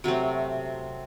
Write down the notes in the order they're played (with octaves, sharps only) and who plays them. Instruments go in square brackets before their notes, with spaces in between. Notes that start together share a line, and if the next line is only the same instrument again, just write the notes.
[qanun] C3 F#3 A3 C4